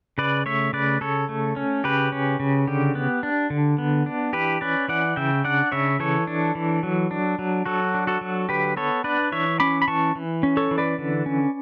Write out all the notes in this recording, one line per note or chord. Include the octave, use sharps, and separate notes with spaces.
C#3 B4 D5
A3 C#5 E5
C#3 B4 D5
C#3 A4 C#5
A3
C#4
C#3 G4 B4
C#4
C#3
D3 G4
B3
D4
D3
B3
D4
E3 G4 B4
C#4 B4 D5
E3 D5 F#5
C#3 E5 G5
D4 D5 F#5
C#3 C#5 E5
E3 A4 C#5
D4
E3
F#3
D4
F#3
F#3 F#4 A4
D4
F#4 A4
F#3
D3 G4 B4
B3 A4 C#5
D4 B4 D5
E3 C#5 E5
C#4 B5 D6
B5
E3 A5 C#6
E3
C#4
A4 C#5
E3
B4 D5
D3
C#4